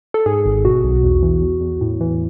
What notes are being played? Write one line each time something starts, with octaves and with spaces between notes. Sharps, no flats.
A4
G#2 G#4
G#1
B2 F#4
B1
E2
E3
E2
E2
A2
E3